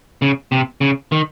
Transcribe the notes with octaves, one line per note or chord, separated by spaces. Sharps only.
C#3
C3
C#3
D#3